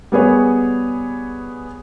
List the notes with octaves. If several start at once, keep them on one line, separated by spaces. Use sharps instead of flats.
G3 B3 G#4 C#5